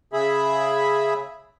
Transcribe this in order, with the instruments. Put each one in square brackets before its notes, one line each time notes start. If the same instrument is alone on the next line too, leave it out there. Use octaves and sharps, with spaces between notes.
[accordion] C#3 G#4 E5 B5